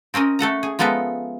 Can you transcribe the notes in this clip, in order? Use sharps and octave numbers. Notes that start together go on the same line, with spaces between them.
C4 C#4 A#4 D#5
A3 A4 F#5 A#5
G#4
F3 G#3 B3 A4 A#4 E5